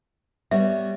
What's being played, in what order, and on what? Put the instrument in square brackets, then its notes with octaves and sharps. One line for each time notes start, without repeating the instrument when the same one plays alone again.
[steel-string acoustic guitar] G3 B3 C#5 [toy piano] E5